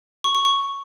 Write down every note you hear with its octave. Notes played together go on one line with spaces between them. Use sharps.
C#6
C#6
C#6